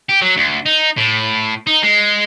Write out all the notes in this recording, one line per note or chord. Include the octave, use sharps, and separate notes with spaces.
G4
F#3
D2
D#4
A2
D#4
G#3